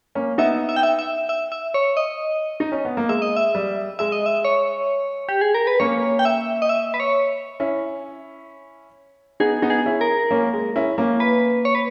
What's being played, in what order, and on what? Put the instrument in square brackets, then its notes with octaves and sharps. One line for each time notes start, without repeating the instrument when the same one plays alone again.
[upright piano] A#3 C#4
[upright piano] B3 D#4 [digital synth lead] E5
[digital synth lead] E5
G5
E5
E5
E5
E5
C#5
D#5
[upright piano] D#4
C#4
B3
A#3
[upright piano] G#3 [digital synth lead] E5
[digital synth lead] D#5
E5
[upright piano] G3
[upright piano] G#3 [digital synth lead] E5
[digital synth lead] D#5
E5
C#5
G4
G#4
A#4
B4
[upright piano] A#3 C#4 [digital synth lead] C#5
[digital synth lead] G5
E5
D#5
E5
B4
C#5
[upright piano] C#4 E4
[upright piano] B3 D#4 [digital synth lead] G#4
[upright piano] B3 D#4
[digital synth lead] G#4
[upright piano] C#4 E4
[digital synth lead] A#4
[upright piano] A#3 C#4
G#3
C#4 E4
A#3 C#4
[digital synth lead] B4
C#5
B4